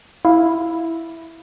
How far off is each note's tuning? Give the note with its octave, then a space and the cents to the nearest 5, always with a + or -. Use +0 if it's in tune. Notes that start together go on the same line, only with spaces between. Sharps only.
E4 +0 F5 +0